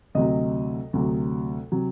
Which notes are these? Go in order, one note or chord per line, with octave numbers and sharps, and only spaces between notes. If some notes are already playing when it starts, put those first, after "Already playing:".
D2 C3 F#3 D#5
D2 C3 F#3
C3 F#3